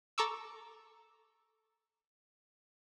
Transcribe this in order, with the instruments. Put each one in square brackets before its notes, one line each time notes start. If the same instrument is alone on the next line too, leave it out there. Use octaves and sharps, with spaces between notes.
[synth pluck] A4 A#5 C#6 D6 E6